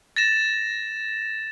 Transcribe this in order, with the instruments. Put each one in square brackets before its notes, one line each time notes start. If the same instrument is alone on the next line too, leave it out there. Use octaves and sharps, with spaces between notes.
[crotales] A6 A#6 E7